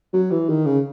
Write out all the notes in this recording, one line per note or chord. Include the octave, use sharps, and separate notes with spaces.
F#3
E3
D#3
C#3